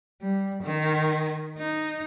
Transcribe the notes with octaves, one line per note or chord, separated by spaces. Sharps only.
G3
D#3
D#4